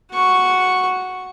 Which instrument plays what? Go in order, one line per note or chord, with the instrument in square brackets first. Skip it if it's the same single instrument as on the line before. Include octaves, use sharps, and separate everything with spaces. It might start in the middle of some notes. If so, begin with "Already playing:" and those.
[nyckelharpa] F#4 C#6